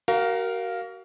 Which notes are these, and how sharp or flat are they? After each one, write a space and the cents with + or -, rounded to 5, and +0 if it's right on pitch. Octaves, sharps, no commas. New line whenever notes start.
F#4 +35 A#4 +0 F5 +0